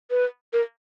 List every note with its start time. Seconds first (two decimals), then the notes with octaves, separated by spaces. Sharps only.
0.11 B4
0.53 A#4